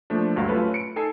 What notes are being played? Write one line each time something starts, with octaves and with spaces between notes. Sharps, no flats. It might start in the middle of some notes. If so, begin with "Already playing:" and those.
F3 A3 A#3 D4
D2 G2 F#3 F5
A3 C#4 F4 A4 B4
C#7 D7
D#4 A4 G#5 C7